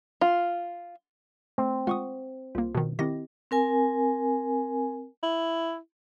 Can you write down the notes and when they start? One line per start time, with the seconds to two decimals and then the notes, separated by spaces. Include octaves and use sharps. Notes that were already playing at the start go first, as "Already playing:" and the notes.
0.21 F4
1.58 A3 C4
1.87 G#3 F4 F#5 C#6 D#6
2.55 C2 A#3 F4
2.75 B2 D#3
2.99 D#3 C4 E4 G4 D#5 A#6
3.51 C4 A#4 G#5
5.23 E4